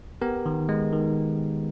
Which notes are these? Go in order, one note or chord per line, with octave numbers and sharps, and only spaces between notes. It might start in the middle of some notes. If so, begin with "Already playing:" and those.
B3 G4 A#4
D#3
G#3
D#3